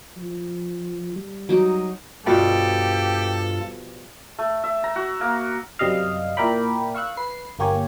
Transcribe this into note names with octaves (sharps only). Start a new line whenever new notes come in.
F3
G3
F#3 D#4 D6
G2 B2 F3 G3 F4 G4 A4
A3
E5
A#5
F#4
A#3
F#2 C3 G3 D#5 F5
A#2 E4 A#4 D5 G5 B5
F5 C#6 E6 F#6
B4 C7
G1 A#3 G4 C#5 G#5